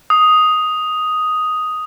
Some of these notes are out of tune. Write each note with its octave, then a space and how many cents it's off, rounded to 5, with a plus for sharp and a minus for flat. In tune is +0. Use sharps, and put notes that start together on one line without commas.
D#6 +5